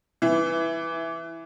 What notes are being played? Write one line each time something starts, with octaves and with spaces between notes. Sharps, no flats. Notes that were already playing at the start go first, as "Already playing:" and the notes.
E3